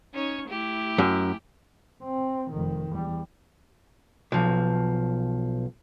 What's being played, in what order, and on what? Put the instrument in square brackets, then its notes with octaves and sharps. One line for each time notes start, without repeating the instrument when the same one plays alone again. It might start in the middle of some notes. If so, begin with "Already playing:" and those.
[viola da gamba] C#4 D#4 C#5
A3 E4 G4
[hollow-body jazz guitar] F#2
[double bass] C4
F1 D#3
E2 G3
[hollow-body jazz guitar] B1 F3